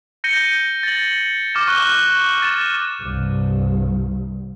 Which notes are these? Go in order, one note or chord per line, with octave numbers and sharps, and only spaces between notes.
G6 A#6 C#7 D#7 G7
A6 F#7
D6 F6 A6 E7
C#6 F#6 G7
F#7
A6 D#7 E7
C2 G2